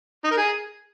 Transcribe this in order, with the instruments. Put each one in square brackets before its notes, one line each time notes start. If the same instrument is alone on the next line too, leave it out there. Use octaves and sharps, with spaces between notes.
[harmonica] D#4
A#4
G#4